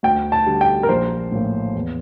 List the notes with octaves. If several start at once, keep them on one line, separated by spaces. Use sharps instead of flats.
D2 G5
A5
D3 G3
G5
A#4
A#1 C5
A2 F3 A#3
E2